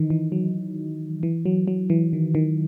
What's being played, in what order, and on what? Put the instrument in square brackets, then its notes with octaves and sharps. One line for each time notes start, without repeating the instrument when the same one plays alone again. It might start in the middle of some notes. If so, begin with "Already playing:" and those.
Already playing: [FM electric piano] D#3 E3 D#4
E3
F#3
E3
F#3
F#3
E3
D#3
D#3